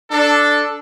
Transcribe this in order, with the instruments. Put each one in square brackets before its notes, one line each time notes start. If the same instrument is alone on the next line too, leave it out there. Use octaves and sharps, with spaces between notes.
[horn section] D4 A4